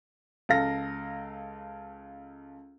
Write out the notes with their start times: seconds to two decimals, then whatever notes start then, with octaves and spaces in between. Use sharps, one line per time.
0.49 C#2 A4 F5 A#6